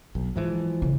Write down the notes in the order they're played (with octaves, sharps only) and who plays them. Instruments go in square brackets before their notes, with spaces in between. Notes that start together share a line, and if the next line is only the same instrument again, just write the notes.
[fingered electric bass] B1 [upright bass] F#3
[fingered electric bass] G#2 E3 F3
[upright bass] C#3